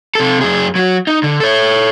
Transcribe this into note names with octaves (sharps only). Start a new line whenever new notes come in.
C3 A4
F#2 G#4
F#3 F#4
D#4
D3
A4 C#5